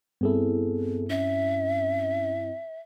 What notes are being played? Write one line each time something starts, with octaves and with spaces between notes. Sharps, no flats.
G2 B3 C4 E4 G#4 A4
C#4 E5